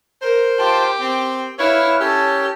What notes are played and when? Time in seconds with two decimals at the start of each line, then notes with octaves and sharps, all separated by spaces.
0.22 A#4 C5
0.59 F4 G4 G5 A5
1.01 C4 G5
1.59 E4 B4 C#5 F5
2.01 C#4 G4 A4 C#5 E6